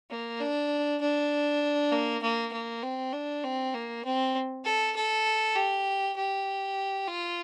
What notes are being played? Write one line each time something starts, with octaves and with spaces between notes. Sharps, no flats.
A#3
D4
D4
A#3
A#3
A#3
C4
D4
C4
A#3
C4
A4
A4
G4
G4
F4